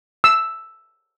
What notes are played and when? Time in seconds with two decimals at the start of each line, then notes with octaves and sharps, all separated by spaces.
0.24 E6